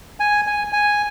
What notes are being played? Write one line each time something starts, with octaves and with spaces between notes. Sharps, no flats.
G#5
G#5
G#5